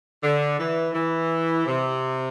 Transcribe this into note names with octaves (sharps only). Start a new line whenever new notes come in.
D3
E3
E3
C3